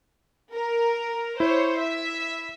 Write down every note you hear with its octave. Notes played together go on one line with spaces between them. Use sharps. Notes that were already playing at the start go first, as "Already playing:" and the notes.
A#4
E4 C5 C#5
E5